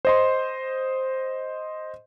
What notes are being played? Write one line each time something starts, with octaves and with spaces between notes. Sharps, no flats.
C5 D#5 C6